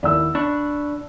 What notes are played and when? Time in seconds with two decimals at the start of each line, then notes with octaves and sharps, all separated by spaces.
0.03 D#2 D#3 E4 D5 F#5 E6
0.35 D4 B5 C#6 F#6